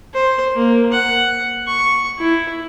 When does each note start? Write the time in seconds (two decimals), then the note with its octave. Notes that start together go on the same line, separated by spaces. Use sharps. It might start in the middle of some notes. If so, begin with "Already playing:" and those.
0.13 C5
0.55 A#3
0.92 F#5
1.67 C#6
2.19 E4